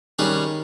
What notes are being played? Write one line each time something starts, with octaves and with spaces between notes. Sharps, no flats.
D#3 G3 C#4 G#4 B4